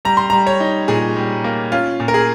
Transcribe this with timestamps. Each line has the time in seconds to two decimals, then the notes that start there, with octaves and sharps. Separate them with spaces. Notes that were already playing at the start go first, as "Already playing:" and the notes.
0.05 G3 A#5
0.17 C6
0.30 A#5
0.33 G3
0.47 C#5
0.60 D#4
0.88 A#2 G#4
1.16 G3
1.44 A#3
1.72 C#4 F4
2.00 A#2
2.08 A#4
2.14 G#4